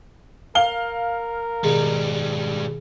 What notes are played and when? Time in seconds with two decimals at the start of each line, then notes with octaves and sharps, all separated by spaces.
0.55 A#4 F5 G7
1.63 G#2 B2 D#3 G3 G#4